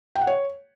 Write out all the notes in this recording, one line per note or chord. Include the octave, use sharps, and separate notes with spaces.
G5
F#5
C#5